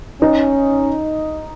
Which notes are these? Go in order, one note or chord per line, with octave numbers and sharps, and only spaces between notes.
C#4 D#4